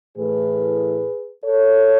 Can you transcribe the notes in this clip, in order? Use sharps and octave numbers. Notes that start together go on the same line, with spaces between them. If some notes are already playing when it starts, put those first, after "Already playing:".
A2 E3 A3 G#4 B4
A4 C#5